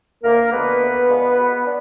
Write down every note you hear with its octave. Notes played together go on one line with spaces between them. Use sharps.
D2 A#3 A#4
D3 F3 G#3 B3 B4
D2
D3 F3 G#3
B2
D4